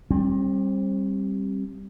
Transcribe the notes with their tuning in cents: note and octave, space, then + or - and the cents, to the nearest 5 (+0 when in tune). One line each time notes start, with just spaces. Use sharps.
G3 +0 C4 +35